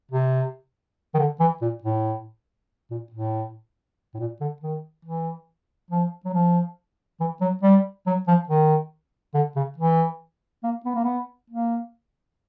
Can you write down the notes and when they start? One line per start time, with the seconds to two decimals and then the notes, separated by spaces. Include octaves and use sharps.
0.11 C3
1.15 D#3
1.19 D3
1.40 E3
1.62 A#2
1.84 A2
2.91 A#2
3.12 A2
4.14 A2
4.19 A#2
4.41 D3
4.62 D#3
5.05 E3
5.91 F3
6.25 F#3
6.34 F3
7.20 E3
7.41 F#3
7.63 G3
8.07 F#3
8.28 F3
8.49 D#3
9.34 D3
9.56 C#3
9.78 E3
10.64 A#3
10.85 B3
10.95 A#3
11.04 B3
11.50 A#3